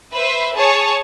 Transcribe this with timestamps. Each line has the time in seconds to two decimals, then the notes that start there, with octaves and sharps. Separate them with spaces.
0.13 B4 C5 E5
0.55 G#4 C#5 A5